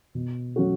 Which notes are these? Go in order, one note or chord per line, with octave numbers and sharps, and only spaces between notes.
B2
F#3 A3 C#4 F#4